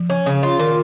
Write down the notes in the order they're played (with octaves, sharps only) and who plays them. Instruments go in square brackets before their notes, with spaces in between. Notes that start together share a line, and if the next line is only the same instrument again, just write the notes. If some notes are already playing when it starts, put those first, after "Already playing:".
Already playing: [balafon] F3
[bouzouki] C#4
C#3
F4
[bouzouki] A#2 [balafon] D#3